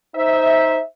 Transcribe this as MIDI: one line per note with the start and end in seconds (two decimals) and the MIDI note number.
0.15 0.79 63
0.15 0.79 72
0.15 0.79 76